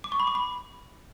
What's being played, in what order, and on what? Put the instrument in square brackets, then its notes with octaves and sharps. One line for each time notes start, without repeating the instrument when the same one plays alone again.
[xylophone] D6
C#6
B5
D6
B5